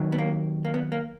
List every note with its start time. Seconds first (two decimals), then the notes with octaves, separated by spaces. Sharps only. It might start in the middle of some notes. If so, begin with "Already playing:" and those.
Already playing: D#2 D#3 F#3
0.12 B3
0.18 A#3
0.65 A#3
0.74 B3
0.92 A#3